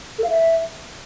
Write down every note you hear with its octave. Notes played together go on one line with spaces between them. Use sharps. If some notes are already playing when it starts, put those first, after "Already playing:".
A4
F5
E5